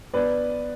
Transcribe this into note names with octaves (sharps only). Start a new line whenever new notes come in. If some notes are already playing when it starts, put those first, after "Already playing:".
B3 B4 D5